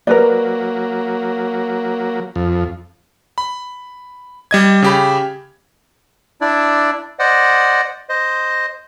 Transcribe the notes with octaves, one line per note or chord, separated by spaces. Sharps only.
F#3 A#3 A#4 B4 D5
F2
B5
G3 D#5 G#6
C#3 G4 B5
D4 E4 D5
C5 D5 D#5 F#5
C5 D#5